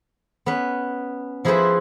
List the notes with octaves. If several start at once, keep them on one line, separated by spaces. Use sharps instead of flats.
B3 C#4 B4
F3 E4 G#4 A4 B4 C5